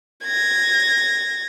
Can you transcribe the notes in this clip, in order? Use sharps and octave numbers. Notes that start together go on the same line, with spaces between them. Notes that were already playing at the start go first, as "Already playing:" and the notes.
G#6 A#6